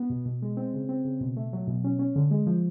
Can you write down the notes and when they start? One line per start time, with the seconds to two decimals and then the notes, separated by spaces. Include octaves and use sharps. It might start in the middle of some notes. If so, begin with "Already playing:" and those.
Already playing: B3
0.10 B2
0.25 B2
0.42 G#3
0.57 C4
0.73 C#3
0.89 C4
1.05 C#3
1.21 B2
1.36 A3
1.53 F#3
1.67 B2
1.84 C#4
1.99 C#4
2.16 D3
2.31 G#3
2.47 F3